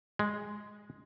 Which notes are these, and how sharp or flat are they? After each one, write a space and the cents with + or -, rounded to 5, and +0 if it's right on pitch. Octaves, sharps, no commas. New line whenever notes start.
G#3 +0